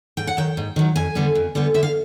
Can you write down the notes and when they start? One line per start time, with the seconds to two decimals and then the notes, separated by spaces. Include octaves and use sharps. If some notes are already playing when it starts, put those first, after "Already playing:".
0.17 G#2 G5
0.27 F#5
0.37 D#3 F#3 G5
0.57 G#2
0.76 D#3 F#3
0.96 F2 G#5
1.15 D3 G3 B3
1.35 F2
1.55 D3 G3 B3
1.74 D3 E5
1.83 F5